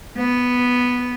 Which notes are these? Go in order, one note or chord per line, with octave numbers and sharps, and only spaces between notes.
B3